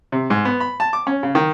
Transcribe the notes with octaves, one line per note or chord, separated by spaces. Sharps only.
C3
G#2
B3
B5
A5
D6
C#4
C#3
D#3